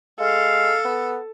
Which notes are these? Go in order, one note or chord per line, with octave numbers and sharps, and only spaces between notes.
G#3 A4 F5
B3